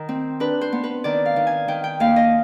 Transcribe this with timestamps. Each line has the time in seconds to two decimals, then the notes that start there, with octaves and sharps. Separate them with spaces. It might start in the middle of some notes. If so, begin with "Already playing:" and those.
Already playing: D#3
0.09 C4
0.40 D4 B4
0.61 C5
0.72 B3
0.84 B4
1.04 D#3 D5
1.26 F5
1.36 D#3
1.47 G#5
1.68 D#3 G5
1.84 G5
2.00 D#2 F5
2.16 D#5